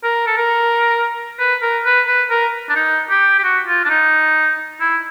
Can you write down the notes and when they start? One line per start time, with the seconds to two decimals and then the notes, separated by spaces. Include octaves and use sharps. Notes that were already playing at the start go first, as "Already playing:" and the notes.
0.04 A#4
0.27 A4
0.38 A#4
1.39 B4
1.62 A#4
1.85 B4
2.08 B4
2.30 A#4
2.70 D4
2.76 D#4
3.10 G4
3.39 G4
3.44 F#4
3.67 F4
3.85 D4
3.90 D#4
4.81 E4